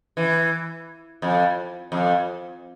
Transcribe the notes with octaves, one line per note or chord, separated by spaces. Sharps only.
E3
F2
F2